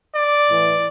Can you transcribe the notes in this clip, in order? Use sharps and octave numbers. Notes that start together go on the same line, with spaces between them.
D5
A2 E3